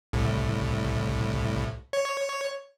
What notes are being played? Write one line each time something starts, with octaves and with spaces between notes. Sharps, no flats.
C2 A2
C#5